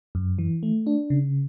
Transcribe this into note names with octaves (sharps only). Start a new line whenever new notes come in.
F#2
E3
A3
D4
C#3